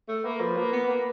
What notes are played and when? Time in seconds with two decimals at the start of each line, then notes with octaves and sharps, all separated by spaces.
0.09 A3
0.25 A#3 B4
0.41 F3
0.57 A#3
0.72 B3
0.89 A#3